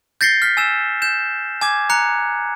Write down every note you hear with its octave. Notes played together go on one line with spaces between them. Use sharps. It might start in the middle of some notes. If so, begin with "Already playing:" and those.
G6 A6 A#6 C7 C#7 G7
F6 B6
G#5 E6 E7
G6 E7
G#5 D6 G#6
A#5 F#6 C#7